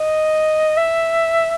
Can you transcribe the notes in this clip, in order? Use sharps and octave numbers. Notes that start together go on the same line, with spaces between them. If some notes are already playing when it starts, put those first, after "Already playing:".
Already playing: D#5
E5